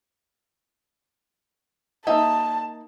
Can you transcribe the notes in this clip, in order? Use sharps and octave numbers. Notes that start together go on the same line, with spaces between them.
A#3 D#4 E5 A5